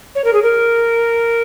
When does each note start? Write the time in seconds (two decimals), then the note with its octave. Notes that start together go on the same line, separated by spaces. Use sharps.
0.15 C#5
0.24 A#4
0.33 G#4
0.43 A#4